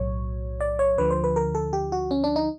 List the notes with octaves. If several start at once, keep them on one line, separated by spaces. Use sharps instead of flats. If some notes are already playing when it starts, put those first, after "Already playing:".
Already playing: B1 A2 F#3 C#5
D5
C#5
D2 D3 F3 B4
C5
B4
A#4
A4
G4
F#4
C#4
D4
D#4